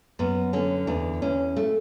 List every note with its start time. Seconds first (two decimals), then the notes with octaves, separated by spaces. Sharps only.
0.19 F#2 B3
0.53 D3 C#4
0.87 E2 D4
1.22 E2 C#4
1.56 A3